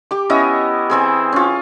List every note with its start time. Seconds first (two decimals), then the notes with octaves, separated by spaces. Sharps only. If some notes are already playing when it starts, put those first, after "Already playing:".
0.11 G4 D6
0.29 B3 C#4 E4 D#5
0.90 E3 C4 G#4
1.33 C#4 F4